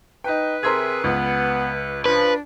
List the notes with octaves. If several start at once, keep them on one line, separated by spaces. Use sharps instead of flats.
D#4 B4 G5
C3 G#4 A#4 E5 C6 G#6
C#2 B3
F3 D4 B4